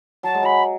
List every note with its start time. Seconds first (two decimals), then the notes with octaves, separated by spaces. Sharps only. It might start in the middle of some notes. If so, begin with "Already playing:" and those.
0.23 F#3 A5
0.34 G#3
0.43 F#3 B5